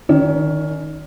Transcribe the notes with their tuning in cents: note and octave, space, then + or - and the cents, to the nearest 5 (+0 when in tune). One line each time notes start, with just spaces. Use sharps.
D#3 +0 C#4 +20 D5 -35